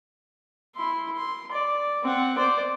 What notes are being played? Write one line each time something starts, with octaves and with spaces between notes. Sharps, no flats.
E4 C6
C6
D5
C4 F#5
C5 D5